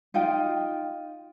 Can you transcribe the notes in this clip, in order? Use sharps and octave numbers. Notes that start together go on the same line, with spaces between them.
D#4 F4 F5 G5